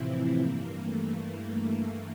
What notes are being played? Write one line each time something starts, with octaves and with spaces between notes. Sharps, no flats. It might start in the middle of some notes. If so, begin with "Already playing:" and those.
Already playing: A2 C3 E3 F3 C4 E4
G2 E3 A#3
A3